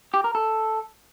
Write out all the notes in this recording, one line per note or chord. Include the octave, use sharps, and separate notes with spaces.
G4
A#4
A4